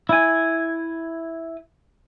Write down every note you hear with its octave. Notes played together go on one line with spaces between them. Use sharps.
E4 G#5